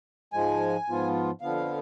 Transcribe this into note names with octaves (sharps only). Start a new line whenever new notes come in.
G#2 F3 G#3 G#5
G#2 F3 B3 F4
F2 D3 F3 B3 F5